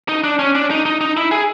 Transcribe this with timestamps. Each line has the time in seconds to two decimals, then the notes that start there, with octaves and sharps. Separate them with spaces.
0.09 D#4
0.24 D4
0.39 C#4
0.55 D4
0.71 D#4
0.85 D#4
1.01 D#4
1.17 E4
1.31 G#4